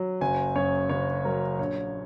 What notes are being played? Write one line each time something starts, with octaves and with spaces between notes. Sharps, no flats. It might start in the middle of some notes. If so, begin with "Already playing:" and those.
Already playing: F#3
F#1 G#5
F#2 C#5
F#1 C#5
F#3 A#4
A#1 C#5